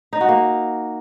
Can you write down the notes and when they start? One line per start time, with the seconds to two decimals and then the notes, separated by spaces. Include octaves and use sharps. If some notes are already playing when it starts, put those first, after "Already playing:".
0.13 D#4
0.21 F#4
0.29 A#3